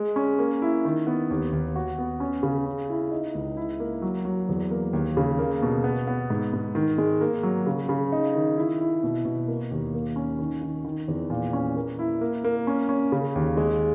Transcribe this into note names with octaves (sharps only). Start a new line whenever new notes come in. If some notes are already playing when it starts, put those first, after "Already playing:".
Already playing: G#3
C#4
A#3
E4
D#3
B3
D#2
D#2
F#4
B3
C#4
C#3
C#4
E4
D#4
C#2
E4
A#3
F#3
F#3
E2
A#3
D#2
C#3
A#3
B2
B3
B3
G#2
G#2
D#3
G#3
A#3
F#3
C#3
C#3
D#4
D#3
E4
E4
B2
B2
A#3
D#2
A#3
C#4
D#3
D#3
D#3
E2
A#2
C#4
A#3
E4
A#3
A#3
C#4
C#4
C#3
D#2
G#3